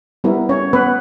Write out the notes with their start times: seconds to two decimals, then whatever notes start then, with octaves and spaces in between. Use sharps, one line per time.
0.24 G3 B3 E4 A#4
0.49 C#4 C#5
0.73 B3 B4